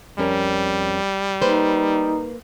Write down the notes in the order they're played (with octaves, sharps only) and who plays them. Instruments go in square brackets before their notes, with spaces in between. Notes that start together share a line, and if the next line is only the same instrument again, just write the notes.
[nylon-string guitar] F2 C#4 A#4 [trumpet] G3
[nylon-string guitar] A#3 B4 C5 [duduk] D#4